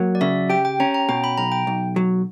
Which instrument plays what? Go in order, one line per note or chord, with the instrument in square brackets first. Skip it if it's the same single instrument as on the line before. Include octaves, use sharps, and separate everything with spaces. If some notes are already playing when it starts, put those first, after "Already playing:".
Already playing: [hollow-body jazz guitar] F#3 A#3
[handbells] D5
[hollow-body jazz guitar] C#3 [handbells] E5
[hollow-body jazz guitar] G4 [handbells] G5
[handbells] G5
[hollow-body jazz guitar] C#4 [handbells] A#5
[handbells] A#5
[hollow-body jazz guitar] B2 [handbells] G5
[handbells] B5
[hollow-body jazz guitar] B1 [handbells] A#5
[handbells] G5
[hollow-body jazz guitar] B1
F#3